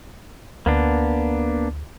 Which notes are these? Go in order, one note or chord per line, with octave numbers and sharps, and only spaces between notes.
D2 A#3 B3 D4